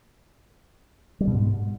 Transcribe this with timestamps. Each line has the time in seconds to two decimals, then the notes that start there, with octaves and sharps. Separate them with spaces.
1.21 G3
1.27 B2
1.34 G#2